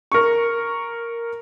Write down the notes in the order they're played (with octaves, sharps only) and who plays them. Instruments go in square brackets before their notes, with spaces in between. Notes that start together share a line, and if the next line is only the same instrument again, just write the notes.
[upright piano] A#4 C#6